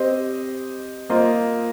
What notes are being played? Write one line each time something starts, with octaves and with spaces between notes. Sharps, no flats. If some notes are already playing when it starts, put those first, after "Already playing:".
Already playing: C4 G4 C5 D#5
A#3 F4 C5 D#5